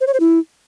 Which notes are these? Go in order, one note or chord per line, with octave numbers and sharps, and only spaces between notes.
C5
C#5
C5
E4